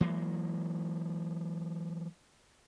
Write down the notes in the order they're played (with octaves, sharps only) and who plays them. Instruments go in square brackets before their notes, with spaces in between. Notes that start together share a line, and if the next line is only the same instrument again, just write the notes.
[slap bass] E3 F#3 G#3 A#3